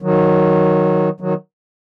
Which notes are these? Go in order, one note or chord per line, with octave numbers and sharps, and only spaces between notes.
D#3 F#3
D#3 F#3